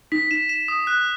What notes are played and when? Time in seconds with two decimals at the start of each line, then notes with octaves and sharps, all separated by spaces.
0.12 D#4 B6
0.31 D#4 E7
0.49 E7
0.68 D#6
0.87 F#6